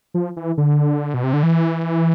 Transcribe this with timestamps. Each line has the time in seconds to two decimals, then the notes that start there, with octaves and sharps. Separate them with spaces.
0.14 F3
0.37 E3
0.58 D3
1.14 B2
1.23 C3
1.33 D3
1.43 E3